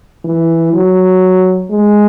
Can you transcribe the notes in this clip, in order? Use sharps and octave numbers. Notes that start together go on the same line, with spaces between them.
E3
F#3
G#3